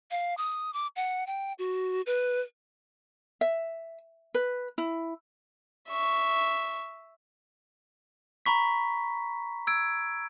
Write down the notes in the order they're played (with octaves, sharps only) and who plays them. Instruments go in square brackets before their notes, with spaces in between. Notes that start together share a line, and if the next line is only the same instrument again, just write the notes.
[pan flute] F5
D#6
D6
F#5
G5
F#4
B4
[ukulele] E5
B4
E4
[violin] E5 C#6
[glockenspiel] A#5 B5 C#6 B6
E6 G#6 D7